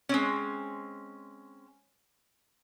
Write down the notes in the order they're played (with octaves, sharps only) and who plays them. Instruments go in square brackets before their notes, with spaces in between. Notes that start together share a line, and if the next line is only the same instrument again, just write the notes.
[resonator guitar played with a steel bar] G#3 C4 C#4